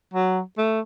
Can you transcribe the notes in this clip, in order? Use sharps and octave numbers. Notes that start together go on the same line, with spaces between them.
F#3
A3